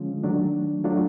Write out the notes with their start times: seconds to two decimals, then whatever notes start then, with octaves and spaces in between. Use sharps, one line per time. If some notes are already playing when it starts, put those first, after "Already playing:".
Already playing: D3 F3 G#3 C#4 F4
0.24 D#3 F#3 A3 D4
0.84 F#3 A3 D4 F4